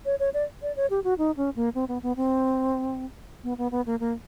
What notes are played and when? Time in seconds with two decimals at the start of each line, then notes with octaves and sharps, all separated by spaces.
0.06 C#5
0.20 C#5
0.34 D5
0.62 D5
0.76 C#5
0.90 G4
1.04 F#4
1.18 D#4
1.37 C#4
1.56 A#3
1.75 C4
1.88 B3
2.03 B3
2.16 C4
3.44 B3
3.58 B3
3.71 B3
3.86 A#3
4.00 A#3